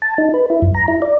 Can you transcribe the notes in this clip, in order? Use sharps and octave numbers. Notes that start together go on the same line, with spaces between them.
A5
D#4
B4
E4
F#2
A#5
E4
D5